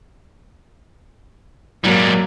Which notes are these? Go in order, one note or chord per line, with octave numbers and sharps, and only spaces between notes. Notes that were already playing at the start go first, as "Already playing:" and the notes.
G#2 F#3 G3 A#3